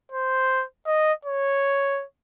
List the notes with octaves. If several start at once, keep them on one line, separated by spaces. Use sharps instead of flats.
C5
D#5
C#5